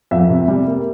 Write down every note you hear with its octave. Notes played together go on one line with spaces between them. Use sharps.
F2 E5
C3
G3
A#3